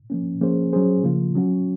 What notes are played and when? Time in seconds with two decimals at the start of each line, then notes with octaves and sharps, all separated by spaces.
0.10 F3 A#3 C#4
0.41 F3 A#3 C#4 G#4 C5
0.73 F#3 C#4 G#4 C5
1.04 C#3 F3 A#3 F4
1.35 F#3 C#4 F#4